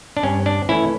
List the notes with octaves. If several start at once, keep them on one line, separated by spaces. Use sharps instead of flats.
D4
G2 C#4
D4
E3 A3 C#4 E4